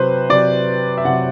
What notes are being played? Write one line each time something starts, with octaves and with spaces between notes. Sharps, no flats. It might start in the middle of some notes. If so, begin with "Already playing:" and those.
Already playing: C3 F#3 B4 C5
C3 F#3 D5
E5
C3 F#3 F#5